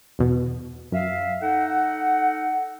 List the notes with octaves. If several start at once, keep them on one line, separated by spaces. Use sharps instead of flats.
E2 B2
F#2 E5 F5
D#4 A4 F#5